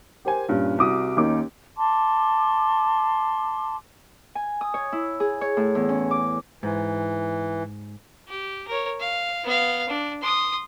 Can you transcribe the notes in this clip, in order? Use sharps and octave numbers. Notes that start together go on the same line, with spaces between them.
G4 A#4 C5 G#5
G2 A#2 C#4
C2 F#4 D6 D#6
D#2 A#3 C#4 D#4 D6
A5 C6 D6
G#5
D#6
C#5
E4
G#4
C#5
A2
E2
C#4
D6
G#2 E3
G4
A#4 C#5
F5
B3 F5
D4
C6 D#6